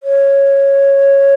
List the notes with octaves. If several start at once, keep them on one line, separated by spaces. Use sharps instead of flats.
C#5